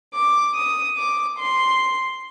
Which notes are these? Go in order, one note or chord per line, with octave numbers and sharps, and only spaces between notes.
D6
D#6
D6
C6